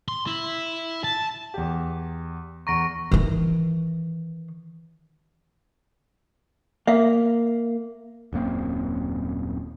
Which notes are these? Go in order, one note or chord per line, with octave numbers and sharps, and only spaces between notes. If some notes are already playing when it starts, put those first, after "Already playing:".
C6
E4
A5
E2 G4
E2 A#5 C#6 A#6 D7
D#3 E3
A#3 E5 F5
D#1 F#2 A#3 C4